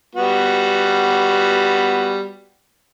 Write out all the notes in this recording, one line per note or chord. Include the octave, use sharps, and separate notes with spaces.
G3 B3 F#4